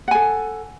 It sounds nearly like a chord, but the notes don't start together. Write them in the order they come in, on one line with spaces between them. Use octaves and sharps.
F#5 G#5 A4